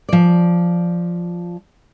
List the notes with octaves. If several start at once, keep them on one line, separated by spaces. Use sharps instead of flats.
F3 D5